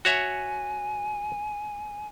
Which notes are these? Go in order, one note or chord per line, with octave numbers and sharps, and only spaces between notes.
F#4 C#5 E5 G#5